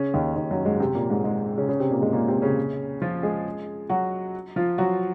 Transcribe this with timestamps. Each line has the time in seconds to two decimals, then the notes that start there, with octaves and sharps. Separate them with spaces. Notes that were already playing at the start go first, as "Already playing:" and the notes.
Already playing: C#3 C#4
0.14 D#2 D#3
0.36 D#2 D#3
0.51 F#2 F#3
0.65 G#2 G#3
0.80 C3 C4
0.95 A#2 A#3
1.10 G#2 G#3
1.24 G#2 G#3
1.57 C#3 C#4
1.69 C#3 C#4
1.80 C3 C4
1.91 A#2 A#3
2.02 G#2 G#3
2.13 A#2 A#3
2.28 C3 C4
2.42 C#3 C#4
3.02 F3 F4
3.23 G#3 G#4
3.89 F#3 F#4
4.56 F3 F4
4.78 F#3 F#4